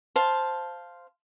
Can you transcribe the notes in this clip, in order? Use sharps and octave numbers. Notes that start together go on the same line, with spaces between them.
C5 F5 A5